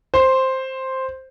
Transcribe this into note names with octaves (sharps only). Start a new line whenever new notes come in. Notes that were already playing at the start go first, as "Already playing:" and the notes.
C5